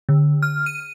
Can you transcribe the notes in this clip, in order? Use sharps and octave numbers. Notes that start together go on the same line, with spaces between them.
D3
F6
D#7